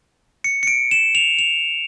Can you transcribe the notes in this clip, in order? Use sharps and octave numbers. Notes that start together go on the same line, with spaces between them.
C#7
C#7
D7
E7
F7
F7